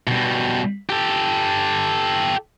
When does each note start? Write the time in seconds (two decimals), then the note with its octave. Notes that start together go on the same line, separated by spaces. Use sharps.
0.07 B2 G3
0.90 G4 A4